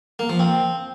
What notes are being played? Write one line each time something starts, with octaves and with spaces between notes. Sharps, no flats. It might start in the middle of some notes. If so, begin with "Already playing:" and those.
A#3
F3
C4